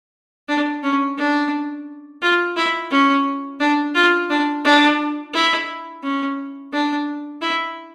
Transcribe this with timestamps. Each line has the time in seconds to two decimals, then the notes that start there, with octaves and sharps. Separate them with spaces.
0.48 D4
0.83 C#4
1.18 D4
2.22 F4
2.56 E4
2.91 C#4
3.60 D4
3.95 F4
4.30 D4
4.65 D4
5.34 E4
6.03 C#4
6.73 D4
7.41 E4